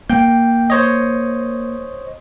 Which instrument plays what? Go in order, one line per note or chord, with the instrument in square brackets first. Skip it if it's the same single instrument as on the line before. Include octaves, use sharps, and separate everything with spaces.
[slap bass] A#3 [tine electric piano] G5 G6
[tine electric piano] C5 C#5 D#5